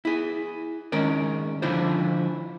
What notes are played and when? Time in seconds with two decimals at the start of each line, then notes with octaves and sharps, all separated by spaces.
0.05 E4 G#4
0.92 D#3 G#3 C#4 A#4 D5
1.62 D3 F3 D4 E4 F4 C5